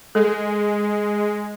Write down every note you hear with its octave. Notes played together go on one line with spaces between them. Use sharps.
G#3 A4